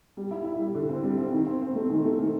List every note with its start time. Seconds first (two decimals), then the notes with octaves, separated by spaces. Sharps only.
0.17 G3
0.31 E4
0.45 E4
0.59 G3
0.75 D3
0.89 C4
1.03 G3
1.17 C4
1.32 D#3
1.46 C4
1.61 C4
1.75 A3
1.90 D#3
2.05 A3
2.19 D#3